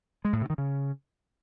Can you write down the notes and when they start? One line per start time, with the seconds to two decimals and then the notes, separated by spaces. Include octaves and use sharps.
0.25 G#3
0.33 A2
0.41 C3
0.50 D#3
0.58 C#3